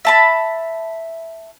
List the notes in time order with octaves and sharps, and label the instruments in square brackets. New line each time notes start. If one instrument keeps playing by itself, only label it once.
[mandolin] E5 A5 B5